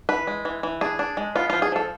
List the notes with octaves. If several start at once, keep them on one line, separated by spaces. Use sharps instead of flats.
E3 B4
G#3
E3
E3
D4 G#4
D4
G#3
B3 F4
F3 F4
G#4
F3 A4